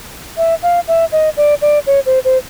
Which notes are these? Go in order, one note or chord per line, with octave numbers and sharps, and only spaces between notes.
E5
F5
E5
D#5
D5
D5
C#5
C5
C5